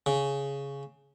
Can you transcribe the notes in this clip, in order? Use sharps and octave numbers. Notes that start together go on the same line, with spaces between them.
C#3